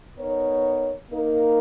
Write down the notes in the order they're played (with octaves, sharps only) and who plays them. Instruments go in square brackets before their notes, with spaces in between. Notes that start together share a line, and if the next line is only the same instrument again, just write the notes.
[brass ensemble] B3 D#4 A#4 C#5
A#3 D#4 A#4